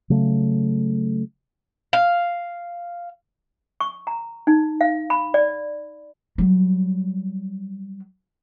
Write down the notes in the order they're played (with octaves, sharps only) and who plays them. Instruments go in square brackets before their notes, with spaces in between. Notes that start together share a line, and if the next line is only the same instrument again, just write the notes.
[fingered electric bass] C#3 F#3 A3
[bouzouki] F5
[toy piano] C#6
A#5
D#4
F5
B5
D5
[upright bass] F#3 G3